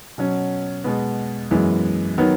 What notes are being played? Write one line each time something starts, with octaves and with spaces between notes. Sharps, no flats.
B2 F#3 C#4
B2 G#3 B3
F#2 E3 G#3 B3
D#3 F#3 B3